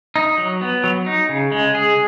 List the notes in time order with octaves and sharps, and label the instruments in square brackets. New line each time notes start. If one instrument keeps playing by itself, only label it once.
[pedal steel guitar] D#4
F#3
B3
F#3
D#4
C#3
G#3
G#4